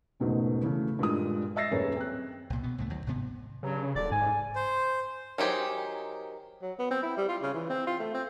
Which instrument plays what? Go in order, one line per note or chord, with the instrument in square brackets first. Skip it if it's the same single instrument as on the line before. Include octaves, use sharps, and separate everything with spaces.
[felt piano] E1 C#2 G#2 B2 A3
C#3 E3 A3
G2 A#2 G#3 D#6
D#5 E5 E6 A6 A#6 C7
D#1 F#2 G#4 B4 C#5
C4 F#6
[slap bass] C2 A#2
B2 B3
C2 A2 D3 A3
D2 D#3 F#3
G1 G#2 C3 B3
[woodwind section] G2 F#3 [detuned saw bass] C#3
[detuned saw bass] D#1 [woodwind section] D3 D5
[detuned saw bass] G#2 [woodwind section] G#5
[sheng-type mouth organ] C5
[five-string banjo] D#3 F#3 G4 G#4 C5
[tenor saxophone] F#3
B3
C4
E4
G3
F4
C#3
E3
C4
F4
A3
C4